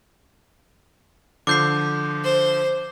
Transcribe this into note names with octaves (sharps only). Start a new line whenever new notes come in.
D3 F3 D6 G6 C7
C5